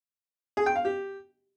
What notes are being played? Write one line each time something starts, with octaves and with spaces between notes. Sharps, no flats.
G#4
G5
F5
G4